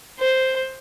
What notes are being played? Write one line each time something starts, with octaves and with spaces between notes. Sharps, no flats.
C5